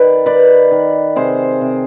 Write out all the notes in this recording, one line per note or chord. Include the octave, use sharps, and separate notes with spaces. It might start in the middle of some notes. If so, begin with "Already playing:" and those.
Already playing: D#3 B4 D5
D#3 B4 D5
D#3
C3 G#4 C5
C3